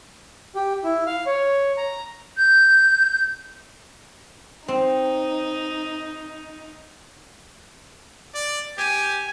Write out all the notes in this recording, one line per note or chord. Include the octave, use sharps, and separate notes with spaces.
G4
E4
F5
C#5
A#5
G6
C4 D#4
D5
G4 G#5